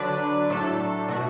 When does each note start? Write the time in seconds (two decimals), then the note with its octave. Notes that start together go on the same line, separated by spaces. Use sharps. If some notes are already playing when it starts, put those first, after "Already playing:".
Already playing: D3 F#3 D4 B4 D5
0.50 A2 F#3 A3 D4 A4
1.09 B2 A3 F#4